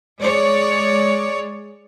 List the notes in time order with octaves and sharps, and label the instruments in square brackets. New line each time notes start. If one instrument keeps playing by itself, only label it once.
[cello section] G#3 C#5 D5